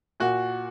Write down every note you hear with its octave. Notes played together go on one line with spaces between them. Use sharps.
A#2 F#4